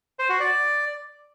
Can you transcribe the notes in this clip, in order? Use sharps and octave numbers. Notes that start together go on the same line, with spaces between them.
C5
F#4
D5